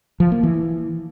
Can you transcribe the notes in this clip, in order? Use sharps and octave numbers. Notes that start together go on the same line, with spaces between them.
F3
A#3
E3